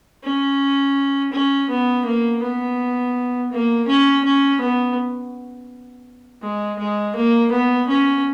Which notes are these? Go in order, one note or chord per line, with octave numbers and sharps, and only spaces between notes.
C#4
C#4
B3
A#3
B3
A#3
C#4
C#4
B3
G#3
G#3
A#3
B3
C#4